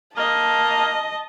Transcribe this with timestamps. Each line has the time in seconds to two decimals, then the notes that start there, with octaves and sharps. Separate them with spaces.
0.17 A#3 D#5 A5